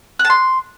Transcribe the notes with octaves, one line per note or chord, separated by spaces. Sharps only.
F#6
A5
C6